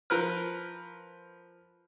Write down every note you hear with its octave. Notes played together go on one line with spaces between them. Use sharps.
F3 A#4 B4 F6